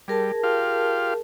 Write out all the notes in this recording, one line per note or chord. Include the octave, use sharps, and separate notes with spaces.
G3 G#4 A#4 A5
F4 G4 F5